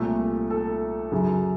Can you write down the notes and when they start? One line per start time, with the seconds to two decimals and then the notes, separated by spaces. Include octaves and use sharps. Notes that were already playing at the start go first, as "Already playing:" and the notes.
Already playing: C2 A#2 A3 A4
0.50 A4
1.12 F#2 C#3 F#3